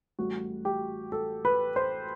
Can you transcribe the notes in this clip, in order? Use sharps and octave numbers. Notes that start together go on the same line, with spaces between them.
A1 A2 G3 F#4
G4
A4
B4
C5